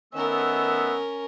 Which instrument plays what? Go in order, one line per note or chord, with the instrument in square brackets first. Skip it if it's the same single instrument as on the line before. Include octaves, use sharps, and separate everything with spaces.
[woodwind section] D#3 E6 [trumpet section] A3 B3 [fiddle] C#4 A#4